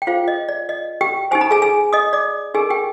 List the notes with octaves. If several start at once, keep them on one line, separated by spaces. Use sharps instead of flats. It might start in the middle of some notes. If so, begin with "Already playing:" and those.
G5
F4 G#4 C5 F5
D#5
D5
D#5
G4 G5
D#4 G4 C5 G#5
A#5
G#4 G#5
G#4 G#5
D#5 D#6
D5 D6
D#4 G4 G#4 A#4 G#5
G4 G5